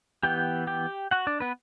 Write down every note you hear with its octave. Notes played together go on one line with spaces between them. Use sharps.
E3 B3 G4 G5
G4 G5
F#4 F#5
D4 D5
B3 B4